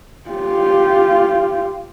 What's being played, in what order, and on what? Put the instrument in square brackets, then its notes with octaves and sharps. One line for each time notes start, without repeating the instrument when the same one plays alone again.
[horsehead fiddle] F4 G4